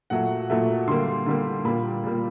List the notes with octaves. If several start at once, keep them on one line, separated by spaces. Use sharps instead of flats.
A#2 F#3 A3 F#5
A#2 F#3 A3
D3 G3 A#3 C6
D3 G3 A#3
A#2 G3 A#3 B5
A#2 G3 A#3